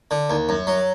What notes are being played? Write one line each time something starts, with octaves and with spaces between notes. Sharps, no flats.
D3
D#2
F#2
F#3